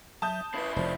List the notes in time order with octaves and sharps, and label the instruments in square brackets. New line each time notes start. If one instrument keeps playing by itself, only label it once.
[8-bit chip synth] F#3 E5 [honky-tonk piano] A5 D#6 G6
[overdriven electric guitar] C#3 E4 [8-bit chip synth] B4 B5
[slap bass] F1 F3 [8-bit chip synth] C5 D5